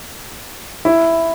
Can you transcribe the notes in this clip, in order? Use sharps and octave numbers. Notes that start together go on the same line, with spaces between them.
E4